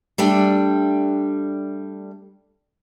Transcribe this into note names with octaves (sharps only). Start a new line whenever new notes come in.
G3 A3 D4 G5